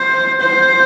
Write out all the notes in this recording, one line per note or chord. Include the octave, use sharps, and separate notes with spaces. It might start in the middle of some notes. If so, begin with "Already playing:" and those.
Already playing: C5
C5